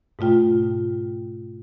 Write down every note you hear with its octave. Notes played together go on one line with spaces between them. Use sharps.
G#2 B2 A3 F4 G5